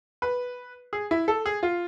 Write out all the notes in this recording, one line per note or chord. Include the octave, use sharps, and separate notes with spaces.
B4
G#4
E4
A4
G#4
F4